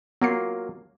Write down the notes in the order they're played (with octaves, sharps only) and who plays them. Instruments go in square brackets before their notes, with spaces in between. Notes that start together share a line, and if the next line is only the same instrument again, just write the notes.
[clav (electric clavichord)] F#3 A#3 F4 [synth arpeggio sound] B3 C7